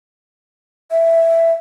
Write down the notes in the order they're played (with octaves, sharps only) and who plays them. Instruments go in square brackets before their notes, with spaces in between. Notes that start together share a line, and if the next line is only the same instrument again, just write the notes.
[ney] E5